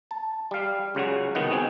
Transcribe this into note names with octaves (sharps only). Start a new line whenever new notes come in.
A5
G3 F5
C#2 C#3 F#3 F#4
C2 D#3 B3 D#4 F#4
B3 C4 D#4 G#4